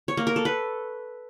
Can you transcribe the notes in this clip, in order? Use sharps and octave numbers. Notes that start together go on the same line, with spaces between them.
C#5
A#3
A#4
A4
B4